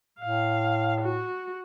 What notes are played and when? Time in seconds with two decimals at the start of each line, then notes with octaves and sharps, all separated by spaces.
0.20 A2 F5
1.01 F#4